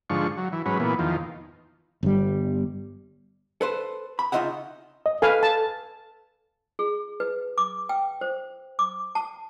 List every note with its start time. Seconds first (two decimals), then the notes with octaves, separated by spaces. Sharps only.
0.10 G#2 D3 F3 C#6
0.37 F#3
0.53 E3
0.66 G#2 F#3 C#4 B4
0.80 A#2 E3 B3
0.99 E2 D#3 F3
2.03 G1 G3
3.61 A4 B4 C5
4.19 B5
4.32 C#3 D#4 F4 D#5 E5 F#5
5.06 D#5
5.22 A4 B4 F5 G#5
5.43 A5
6.79 G#4
7.20 B4
7.58 D6
7.89 G5
8.21 C5
8.79 D6
9.15 A5